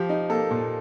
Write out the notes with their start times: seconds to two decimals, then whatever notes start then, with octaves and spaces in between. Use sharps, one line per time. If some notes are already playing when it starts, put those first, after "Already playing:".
Already playing: F3 G4
0.09 D#4
0.30 A#3 A4
0.51 A#2